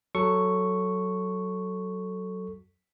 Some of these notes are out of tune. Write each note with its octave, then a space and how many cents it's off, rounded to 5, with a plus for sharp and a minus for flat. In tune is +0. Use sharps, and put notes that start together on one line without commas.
F#3 +10 A4 +10 C#6 +0